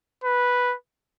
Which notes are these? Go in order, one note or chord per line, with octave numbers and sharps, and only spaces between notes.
B4